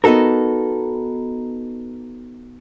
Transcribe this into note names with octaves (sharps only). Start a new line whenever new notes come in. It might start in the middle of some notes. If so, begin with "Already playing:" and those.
B3 D#4 F#4 A4 A#4